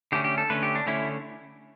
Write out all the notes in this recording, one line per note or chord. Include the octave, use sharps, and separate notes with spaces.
D3 A3 C#4 G4
G4
A4
D3 A3 C#4 B4
G4
D4
D3 A3 C#4 E4